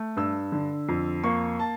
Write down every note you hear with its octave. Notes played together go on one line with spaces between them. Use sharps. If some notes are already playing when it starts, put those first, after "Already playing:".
Already playing: A3
G2 E6
D3
F2
A#3 C#6
A5